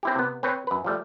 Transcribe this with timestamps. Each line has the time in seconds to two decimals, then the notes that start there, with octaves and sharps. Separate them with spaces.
0.03 C4 E4 G4
0.15 C3 B3
0.43 C4 B4 C#5
0.67 F#2 B4
0.84 F3 G3 A3